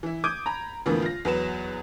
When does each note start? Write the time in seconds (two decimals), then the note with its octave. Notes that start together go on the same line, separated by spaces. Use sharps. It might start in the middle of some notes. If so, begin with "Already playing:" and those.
0.03 E3 E4
0.24 D6 D#6 G6 G#6 D7 D#7
0.46 A#5 B5
0.86 F2 A2 D3 E3 A#3 B3
1.02 F4 A#6
1.25 E2 F#3 B3 B4 E7